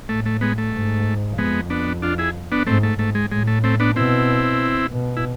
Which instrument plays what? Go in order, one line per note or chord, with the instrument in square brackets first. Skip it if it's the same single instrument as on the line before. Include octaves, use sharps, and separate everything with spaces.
[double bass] A2 [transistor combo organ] A3
[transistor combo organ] A3
G#3 B3
A3
[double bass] G#2
[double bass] F2 [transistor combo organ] G#3 B3
[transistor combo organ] B3 D4
D4 F4
E4 G#4
B3 D4
[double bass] G#2 [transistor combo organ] A3 C4
[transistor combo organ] A3
[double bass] G#2 [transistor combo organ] A3
[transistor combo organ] G#3
[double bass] A2 [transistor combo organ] G#3
[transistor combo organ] A3
A3 C4
B3 D4
[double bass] B2 [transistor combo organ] C4 E4
[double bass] B2
[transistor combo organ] E4